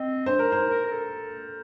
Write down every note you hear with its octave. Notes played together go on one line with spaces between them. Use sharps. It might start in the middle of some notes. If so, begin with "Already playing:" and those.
Already playing: C4 D#5
D4 C5
A#4
D#4 C5
A#4
A#4
A4